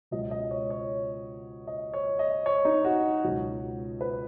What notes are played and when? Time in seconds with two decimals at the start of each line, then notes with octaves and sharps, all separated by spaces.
0.11 C#2 B2 F#3 D#5
0.31 D#5
0.51 C#5
0.70 C#5
1.67 D#5
1.94 C#5
2.19 D#5
2.46 C#5
2.65 D#4
2.85 F#4
3.24 C#2 B2 F#3
4.01 B4